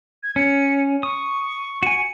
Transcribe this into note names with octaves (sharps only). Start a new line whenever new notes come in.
G#6
C#4 C#7
C#6 D#6
F#4 G#5 C#7